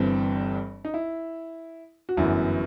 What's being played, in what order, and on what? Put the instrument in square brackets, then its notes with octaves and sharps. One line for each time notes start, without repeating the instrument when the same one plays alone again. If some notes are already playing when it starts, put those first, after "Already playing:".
Already playing: [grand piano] G1 G2 E3 G3 C4
D#4
E4
F#4
G1 F#2 E3 B3 E4